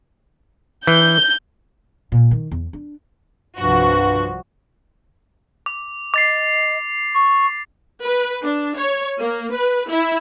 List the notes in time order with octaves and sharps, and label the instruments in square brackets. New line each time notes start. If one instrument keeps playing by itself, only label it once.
[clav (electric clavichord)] E3 [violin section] G6
[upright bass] A#2
D#3
E2
D4
[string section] C2 F3 F#4 [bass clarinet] G2
[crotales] D6
[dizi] D#5 [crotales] D6 A6 C7
[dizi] C#6
[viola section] B4
D4
C#5
A#3
B4
E4